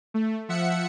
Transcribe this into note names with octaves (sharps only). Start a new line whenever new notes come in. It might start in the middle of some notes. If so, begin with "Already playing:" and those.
A3
F3 E5 F#5 C#7